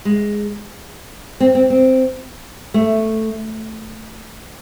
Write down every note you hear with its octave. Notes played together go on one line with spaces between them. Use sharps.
G#3
C4
C4
C4
A3